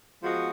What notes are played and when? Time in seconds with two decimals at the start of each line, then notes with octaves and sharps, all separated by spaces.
0.23 F3 G#3 B3 F#4